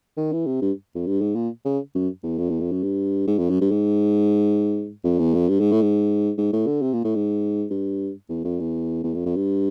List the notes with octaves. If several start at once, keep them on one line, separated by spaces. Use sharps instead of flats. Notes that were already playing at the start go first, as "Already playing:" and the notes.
D#3
E3
C3
G2
F2
G2
G#2
A#2
C#3
F#2
E2
F2
E2
F2
F#2
G2
G#2
F2
F#2
G2
G#2
F2
E2
F2
G2
G#2
A2
G#2
G#2
A2
D3
C3
A#2
A2
G#2
G2
E2
F2
E2
E2
F2
F2
G2